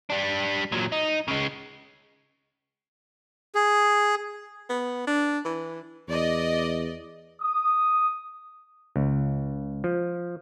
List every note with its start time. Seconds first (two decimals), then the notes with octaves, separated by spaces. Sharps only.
0.10 G3 D4
0.72 A#2 F#3
0.92 D#4
1.28 C#3 G#3
3.55 G#4
4.69 B3
5.07 D4
5.45 E3
6.09 E2 D5 D#5
7.41 D#6
8.96 C#2
9.84 F3